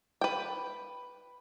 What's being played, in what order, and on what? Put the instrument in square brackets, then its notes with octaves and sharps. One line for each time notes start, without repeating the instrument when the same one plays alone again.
[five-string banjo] B4 G5